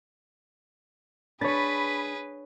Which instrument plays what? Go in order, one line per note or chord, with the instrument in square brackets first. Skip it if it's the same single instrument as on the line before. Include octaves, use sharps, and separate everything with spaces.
[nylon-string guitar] D4 [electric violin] G#4 B4 [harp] C#5 A6 [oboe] B5